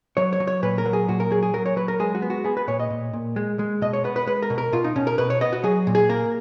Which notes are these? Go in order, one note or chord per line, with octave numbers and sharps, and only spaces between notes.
F#3 C#5
C#5
F#3
C#5
A#2 B4
A#4
F#3
G#4
A#2 F#4
A#4
F#3 G#4
G#4
F#3 A#4
C#5
F#3 B4
A#4
G#3 G#4
F#4
B3
F#4
B3 G#4
B4
A#2 C#5
D#5
A#2
A#2
G#3
G#3
B2 D#5
C#5
B3 B4
B4
G#3 B4
A#4
B2
A#4
B2 F4
D#4
B2 C#4
A#4
B2 B4
C#5
B3 D#5
F#4
F#3 G#4
A#2
G#4
A#3 A#4